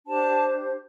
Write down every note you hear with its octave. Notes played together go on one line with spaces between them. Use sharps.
D4 G4 C5 A5